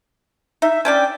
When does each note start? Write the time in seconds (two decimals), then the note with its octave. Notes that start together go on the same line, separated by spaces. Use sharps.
0.62 D#4 E5
0.85 C#4 D4 D5 G5